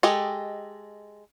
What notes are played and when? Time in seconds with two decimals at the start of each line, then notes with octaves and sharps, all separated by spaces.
0.03 G#3 G4 A4 D#5